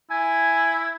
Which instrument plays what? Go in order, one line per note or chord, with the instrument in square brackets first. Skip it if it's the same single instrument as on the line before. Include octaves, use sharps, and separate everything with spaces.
[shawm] E4 [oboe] G#5